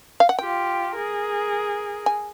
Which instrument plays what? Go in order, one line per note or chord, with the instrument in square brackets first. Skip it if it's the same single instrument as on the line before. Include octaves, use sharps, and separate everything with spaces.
[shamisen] F5
F#5
[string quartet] F4 G4 [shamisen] G5
[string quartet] G#4 A#4
[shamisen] G#5